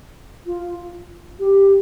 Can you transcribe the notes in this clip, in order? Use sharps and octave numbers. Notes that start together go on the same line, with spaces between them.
F4
G4